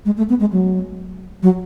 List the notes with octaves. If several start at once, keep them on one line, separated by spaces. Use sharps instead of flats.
G#3
A3
B3
G#3
F#3
F#3